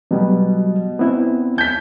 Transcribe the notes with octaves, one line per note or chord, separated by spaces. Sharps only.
B2 F#3 G3 B3
B3 C4 E4
G6 B6